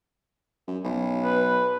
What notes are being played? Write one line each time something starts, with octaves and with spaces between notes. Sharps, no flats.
F#2
B1
B4